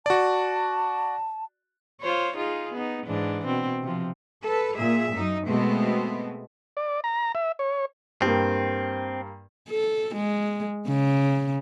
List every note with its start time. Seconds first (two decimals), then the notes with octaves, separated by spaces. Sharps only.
0.06 F#4 D5 A5
2.01 F4 C5 C#5
2.36 D#4 F4 G#4
2.73 B3 D#4
3.06 G#2 E3 D4
3.45 B2 C4
3.83 C3 F3
4.44 A4 B4
4.77 A#2 G#4 E5
5.12 F#2 D#4
5.46 B2 G#3 A3 B3 C4
6.77 D5
7.04 A#5
7.35 E5
7.59 C#5
8.22 G2 A#3 C4
9.69 A4
10.15 G#3
10.87 C#3